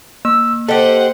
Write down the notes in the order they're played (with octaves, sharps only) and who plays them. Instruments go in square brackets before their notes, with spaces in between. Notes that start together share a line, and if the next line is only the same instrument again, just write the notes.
[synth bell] A#3 [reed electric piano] E6
[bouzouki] G4 D#5 [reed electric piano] A4 [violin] C5 F#5